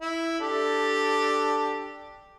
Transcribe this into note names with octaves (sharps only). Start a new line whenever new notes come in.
E4
D4 G4 A4